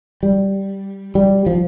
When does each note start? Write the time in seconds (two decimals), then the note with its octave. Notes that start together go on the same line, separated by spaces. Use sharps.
0.23 G3
1.15 G3
1.46 F3